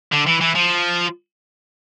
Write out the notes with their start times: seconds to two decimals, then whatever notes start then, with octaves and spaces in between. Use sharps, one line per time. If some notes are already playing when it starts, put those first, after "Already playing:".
0.13 D3
0.27 E3
0.41 E3
0.55 F3